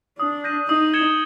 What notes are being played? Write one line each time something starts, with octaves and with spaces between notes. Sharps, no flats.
D4 D#6
G6 A#6 D#7
D#4 D#6
G#6 C#7 E7 G7